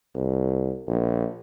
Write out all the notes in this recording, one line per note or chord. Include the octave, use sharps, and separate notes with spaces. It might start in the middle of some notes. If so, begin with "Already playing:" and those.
C2
A#1